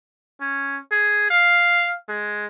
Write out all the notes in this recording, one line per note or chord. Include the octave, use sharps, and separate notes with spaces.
C#4
G#4
F5
G#3